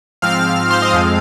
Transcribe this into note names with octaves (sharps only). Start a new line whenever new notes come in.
G#2 F3 C4 F5 F6
C5 C6
D#5
F2 F3 G#3 C4 F5